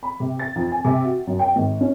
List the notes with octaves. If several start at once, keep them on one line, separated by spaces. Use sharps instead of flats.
B5
C3
A6
F2
G#5
C3
F#4
F#2
G5
G#1
C#4